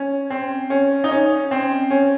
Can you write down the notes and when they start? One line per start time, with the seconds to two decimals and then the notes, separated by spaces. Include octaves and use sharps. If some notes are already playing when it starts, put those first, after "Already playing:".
Already playing: C#4
0.30 C4
0.70 C#4
1.04 D#4
1.11 C#4
1.51 C4
1.91 C#4